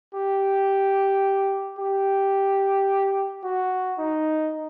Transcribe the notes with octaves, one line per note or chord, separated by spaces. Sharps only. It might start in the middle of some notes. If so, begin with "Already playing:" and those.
G4
G4
F#4
D#4